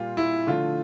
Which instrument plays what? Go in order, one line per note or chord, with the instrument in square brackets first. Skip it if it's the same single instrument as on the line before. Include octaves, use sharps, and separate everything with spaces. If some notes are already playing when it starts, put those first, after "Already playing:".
Already playing: [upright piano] A#2 G3 A#3 F4
E4
D3 F3 A3 F4